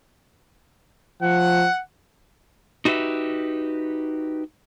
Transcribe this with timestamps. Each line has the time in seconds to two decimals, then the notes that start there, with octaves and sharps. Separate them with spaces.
1.22 F3 F#5
2.85 D#4 F#4 G4 B4 E5